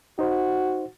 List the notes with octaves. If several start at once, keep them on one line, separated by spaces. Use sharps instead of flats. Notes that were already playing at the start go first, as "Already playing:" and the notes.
D#4 F#4 C5